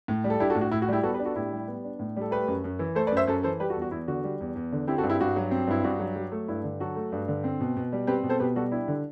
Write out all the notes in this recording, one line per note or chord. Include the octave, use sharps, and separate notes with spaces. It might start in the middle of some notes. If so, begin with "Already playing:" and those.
A2
G3
A4
D4 E4 G4
F#4 A4
A2
F#4
A2 E4
F#4
G3 E4 G4
B3 F#4 A4
G4 B4
D4
F#4 A4
A2 E4 G4
G3
B3
D4
A2
G3 A4
A3 G4 B4
F#2
F#2
E3
A3 A4 C5
B4 D5
F#2
C5 E5
F#2 A4 C5
E3 A4 C5
G3 G4 B4
F#4 A4
E2
F#4
E2 E4
D3 F#4
G3
E2
E2
D3
C4 E4 G4
F#4 A4
G2
E4 G4
G2 F#4
F#3
C4
G2 E4
G2 F#4
F#3
F#3
A3
G2 E4
D3
F#3 F#4 A4
A3
G2
D3
C4
B2
B2
G3
C4 G4 B4
B2
A4 C5
B2 G4 B4
G3 F#4 A4
D4 E4 G4
D3